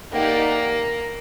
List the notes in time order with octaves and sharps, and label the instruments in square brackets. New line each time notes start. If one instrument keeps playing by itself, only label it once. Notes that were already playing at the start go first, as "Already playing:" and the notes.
[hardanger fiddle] A#3 [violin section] D#4 G4 A#4 D5 F#5